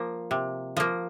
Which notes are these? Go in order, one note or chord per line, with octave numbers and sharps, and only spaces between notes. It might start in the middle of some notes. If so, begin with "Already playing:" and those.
Already playing: F3 A#3
C3
F3 A#3